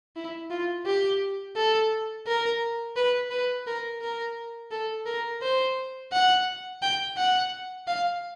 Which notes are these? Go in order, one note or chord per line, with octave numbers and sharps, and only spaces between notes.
E4
F4
G4
A4
A#4
B4
B4
A#4
A#4
A4
A#4
C5
F#5
G5
F#5
F5